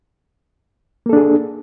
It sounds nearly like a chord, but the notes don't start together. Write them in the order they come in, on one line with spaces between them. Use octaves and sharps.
A#3 A4 D4 G#4